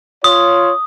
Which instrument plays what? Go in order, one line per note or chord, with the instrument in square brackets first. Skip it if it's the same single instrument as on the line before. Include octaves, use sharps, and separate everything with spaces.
[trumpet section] F4 C#5 [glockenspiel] D#6